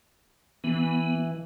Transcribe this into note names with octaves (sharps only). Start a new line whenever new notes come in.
E3 B3